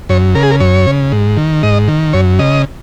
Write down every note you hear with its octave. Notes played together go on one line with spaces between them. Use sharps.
F#2 C#5
C#3 A#4
G#4
A#4
F#2 C#5
C#3
G#2
D#3
G#2 D#5
D#3
F#2 C#5
C#3 D#5